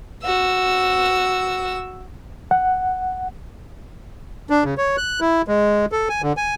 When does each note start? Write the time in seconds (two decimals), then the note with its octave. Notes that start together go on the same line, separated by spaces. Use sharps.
0.24 F#4 E6
2.51 F#5
4.50 D4
4.64 C#3
4.78 C#5
4.97 F#6
5.21 E4
5.48 G#3
5.92 A4
6.09 G#5
6.22 D3
6.37 G#5